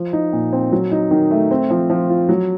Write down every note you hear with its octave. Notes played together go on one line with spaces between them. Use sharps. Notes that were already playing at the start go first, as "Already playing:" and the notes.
Already playing: F3
D#4
A#2
C4
F#3
D#4
D#3
A3
C4
F3
F3
F4
F#3